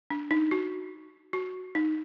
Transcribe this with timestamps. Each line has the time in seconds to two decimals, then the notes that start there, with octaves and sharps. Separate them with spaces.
0.10 D4
0.31 D#4
0.51 F#4
1.33 F#4
1.75 D#4